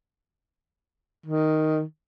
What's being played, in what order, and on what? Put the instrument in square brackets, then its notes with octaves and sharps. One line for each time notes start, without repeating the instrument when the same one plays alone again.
[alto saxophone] D#3